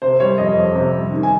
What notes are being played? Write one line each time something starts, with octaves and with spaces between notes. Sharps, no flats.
C3 C5
G3 C#5
F2 D#5
F2
C3
G3
D#3
G#5